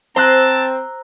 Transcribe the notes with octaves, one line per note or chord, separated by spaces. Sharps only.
C4 C5 A5 A#5 E6 F#6